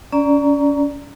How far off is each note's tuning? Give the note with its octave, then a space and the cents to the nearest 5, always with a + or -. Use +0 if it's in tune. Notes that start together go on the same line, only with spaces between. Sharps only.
C#4 +30 D5 +0 A#5 -5